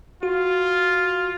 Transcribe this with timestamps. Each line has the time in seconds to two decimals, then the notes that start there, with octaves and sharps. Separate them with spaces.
0.23 F4 F#4